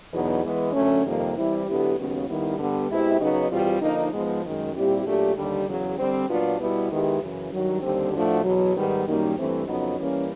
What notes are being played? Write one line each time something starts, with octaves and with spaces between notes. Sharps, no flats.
E2 B2 F#3 B3 D#4
E3 G#3 B3
F#2 D3 F#3 A3 C#4
F2 C3 D#3 G3 A#3
E3 G3 C4 E4
D3 F#3 B3 E4 G4
D#2 C#3 F#3 B3
D#2 D#3 G3 B3 E4
G2 D3 G3 B3
B2 G#3 C4 E4 G4
C#3 F#3 B3 D#4
E2 B2 G3 C4 F4
D3 F3 A#3 D#4
G#2 F3 G#3 B3
F#2 D#3 G#3
A#2 G3 C4 E4 G4
A#2 F#3 A3 D4 G4
D#2 D3 G3
E2 C#3 F#3
D3 G3 C4
A#2 F#3 B3 D4 F4
B2 G3 B3 E4
D#3 G#3 B3 E4 G4
F#2 C#3 E3
G2 D#3 F#3
D#2 D3 G3 C4
A2 F3 A3 D4 F#4
E2 B2 F#3
G#2 D#3 G3 B3 D#4
F#2 D#3 G3 A#3 D#4
G2 E3 A3 C4
F2 C#3 F#3 B3 D#4
E3 G3 A#3 C#4